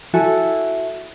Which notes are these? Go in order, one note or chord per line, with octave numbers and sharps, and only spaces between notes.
E4 F#4 A4 G#5